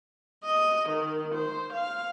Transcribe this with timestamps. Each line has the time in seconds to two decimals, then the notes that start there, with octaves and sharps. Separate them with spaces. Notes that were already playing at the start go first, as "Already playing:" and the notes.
0.44 D#5
0.88 D#3
1.34 C5
1.73 F5